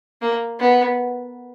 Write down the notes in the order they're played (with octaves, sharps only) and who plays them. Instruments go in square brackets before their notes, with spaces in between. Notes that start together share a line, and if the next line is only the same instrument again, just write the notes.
[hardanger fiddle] A#3
B3